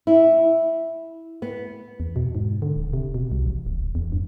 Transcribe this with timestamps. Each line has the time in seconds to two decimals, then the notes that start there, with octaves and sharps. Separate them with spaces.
0.07 E4
1.42 B3
2.00 E2
2.16 B2
2.35 G#2
2.62 D3
2.76 D1
2.93 C3
3.14 B2
3.32 C2
3.46 A1
3.67 D1
3.95 E2
4.12 G2